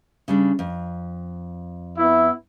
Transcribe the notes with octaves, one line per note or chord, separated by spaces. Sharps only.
C#3 G3 D4
F2
B3 E4